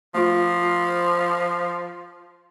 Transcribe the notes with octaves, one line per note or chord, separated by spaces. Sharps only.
F3 A3 F4